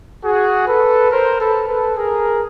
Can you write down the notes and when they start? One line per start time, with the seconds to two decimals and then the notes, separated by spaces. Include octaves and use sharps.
0.24 F#4 G#4
0.67 A4 B4
1.11 A#4 C5
1.39 A4 B4
1.67 A4 B4
1.96 G#4 A#4